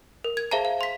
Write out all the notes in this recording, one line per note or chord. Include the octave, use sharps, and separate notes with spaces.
A#4
G#6
G#4 C5 E5 F5 A5 A#5
F5
C6 B6